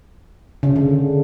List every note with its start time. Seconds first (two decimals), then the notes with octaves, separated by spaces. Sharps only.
0.63 C#3
0.76 D3